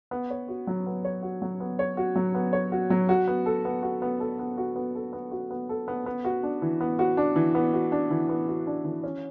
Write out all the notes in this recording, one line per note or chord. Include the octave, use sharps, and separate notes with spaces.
B3
C#5
F#4
F#3
B3
C#5
F#4
F#3
B3
C#5
F#4
F#3
B3
C#5
F#4
F#3
F#4
B3
A4
B3
F#4
B3
A4
B3
F#4
B3
A4
B3
F#4
B3
A4
B3
B3
F#4
D4
E3
B3
F#4
D4
E3
B3
F#4
D4
E3
B3
F#4
D4
E3
C#4